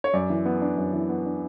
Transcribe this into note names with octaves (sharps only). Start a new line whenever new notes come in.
C#5
F#2 D5
E3
B3
D4
F#2
E3
B3
D4